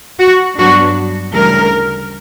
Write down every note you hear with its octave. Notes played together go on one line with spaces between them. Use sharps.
F#4
G2 F#3 B3 D4 F#4
D2 C#3 E3 G3 A#4